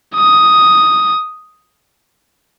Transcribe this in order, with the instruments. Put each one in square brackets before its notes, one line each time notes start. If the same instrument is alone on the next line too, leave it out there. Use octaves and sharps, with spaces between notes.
[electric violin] D#6